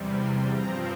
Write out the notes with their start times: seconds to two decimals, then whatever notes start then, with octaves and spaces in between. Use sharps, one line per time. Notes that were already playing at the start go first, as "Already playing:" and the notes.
Already playing: E2 C3 G3
0.19 C6
0.49 G2 F3 C4 A#5